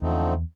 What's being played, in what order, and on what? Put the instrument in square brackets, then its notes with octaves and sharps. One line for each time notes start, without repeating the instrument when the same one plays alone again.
[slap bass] E2 [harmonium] D3 F3 A3 C4 D#4